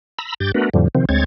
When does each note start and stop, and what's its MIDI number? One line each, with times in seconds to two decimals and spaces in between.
0.19 0.34 82
0.19 0.34 83
0.19 0.34 88
0.40 0.52 43
0.40 0.52 67
0.40 0.52 91
0.40 0.52 93
0.54 0.69 57
0.54 0.69 59
0.54 0.69 62
0.54 0.69 66
0.54 0.69 70
0.54 0.69 71
0.74 0.88 41
0.74 0.88 45
0.74 0.88 50
0.74 0.88 53
0.74 0.88 55
0.95 1.05 48
0.95 1.05 51
0.95 1.05 53
0.95 1.05 60
1.09 1.24 38
1.09 1.24 56
1.09 1.24 60
1.09 1.24 73
1.09 1.24 92
1.09 1.24 93